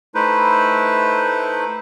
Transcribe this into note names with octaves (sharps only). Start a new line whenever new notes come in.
A3 D#4 E4 B4 C5